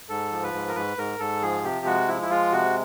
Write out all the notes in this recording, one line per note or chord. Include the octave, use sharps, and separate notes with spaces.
G#2 A4
F3
B4
G#2
A#4
G#2 B4
G#2 A#4
G#2 A4
F3 G#4
C3 G4
G#3 F#4
F3 E4
E4
G#3 F4
C3 F#4